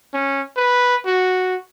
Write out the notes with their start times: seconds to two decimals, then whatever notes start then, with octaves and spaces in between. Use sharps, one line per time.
0.14 C#4
0.57 B4
1.06 F#4